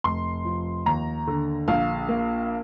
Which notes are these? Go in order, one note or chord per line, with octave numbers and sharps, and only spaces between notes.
F1 C6
F3
D#2 A#5
D3
A#1 F5
A#3